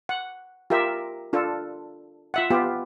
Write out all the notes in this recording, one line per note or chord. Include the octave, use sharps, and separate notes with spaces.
F#5
F4 G4 A#4 E5
D4 F4 A4
F4 E5 F#5
B3 F4 G4